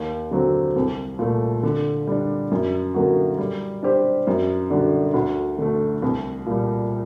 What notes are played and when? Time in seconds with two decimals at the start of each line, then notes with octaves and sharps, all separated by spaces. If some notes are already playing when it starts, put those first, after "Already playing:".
Already playing: D#2
0.31 D3 F#3 C4
0.76 C2
1.19 A#2 A3
1.63 D3
2.07 G3 D4
2.51 F#2
2.94 D3 F#3 A#3 F#4
3.38 G3
3.83 D4 G4 C5
4.27 F#2
4.70 D3 G3 D4 F#4
5.14 D2
5.58 D3 A3
6.02 C2
6.46 A#2 G3